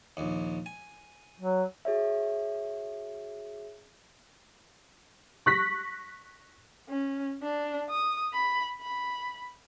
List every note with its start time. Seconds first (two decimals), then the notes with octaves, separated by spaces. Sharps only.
0.17 A#1 D#2
0.66 G#5
1.40 F#3
1.85 F#4 G#4 C#5 E5
5.46 C#6 F#6 A#6 B6
6.89 C#4
7.43 D4
7.90 D#6
8.33 B5
8.81 B5